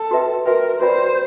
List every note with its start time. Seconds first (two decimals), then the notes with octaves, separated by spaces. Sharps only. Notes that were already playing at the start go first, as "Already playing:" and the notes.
Already playing: A4
0.11 F#4 B4 E5 G5
0.45 F#4 A#4 B4 E5 G5
0.81 F#4 B4 C5 D5 G5 B5